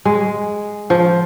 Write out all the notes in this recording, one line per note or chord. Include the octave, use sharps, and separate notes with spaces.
G#3
F3